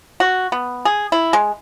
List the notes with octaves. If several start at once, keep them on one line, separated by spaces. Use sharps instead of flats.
F#4
B3
G#4
E4
G#3